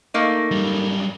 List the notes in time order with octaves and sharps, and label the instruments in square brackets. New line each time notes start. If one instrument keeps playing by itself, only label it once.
[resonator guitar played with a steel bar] A3 A#3 D#4
[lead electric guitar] F#2 G3